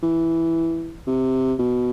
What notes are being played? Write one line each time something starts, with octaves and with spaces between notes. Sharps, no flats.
E3
C3
B2